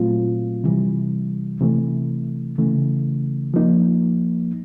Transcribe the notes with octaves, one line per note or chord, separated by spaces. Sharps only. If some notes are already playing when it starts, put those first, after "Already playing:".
Already playing: A#2 F#3 A3 C4 F4
C3 E3 G3
C3 E3 A3
C#3 E3 A3
F3 A#3 D#4